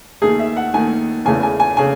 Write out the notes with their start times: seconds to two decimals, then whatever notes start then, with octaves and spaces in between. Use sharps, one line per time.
0.22 D#2 D#3 A3 G#4
0.39 E5
0.57 F#5
0.73 D#2 D#3 A3 G#5
1.25 E2 C#3 E3 A3 G#5
1.43 G#5
1.60 G#5
1.77 C#3 G#5